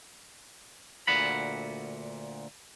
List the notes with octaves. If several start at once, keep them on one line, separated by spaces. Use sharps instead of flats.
D2 A#2 F#5 B5